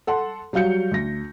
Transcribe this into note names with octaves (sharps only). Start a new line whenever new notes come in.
A4 F#5 C6
F#3 G3 F#4 F5 G6 C#7
D2 A#6